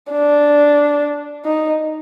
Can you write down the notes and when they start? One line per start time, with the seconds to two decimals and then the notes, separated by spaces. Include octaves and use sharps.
0.12 D4
1.45 D#4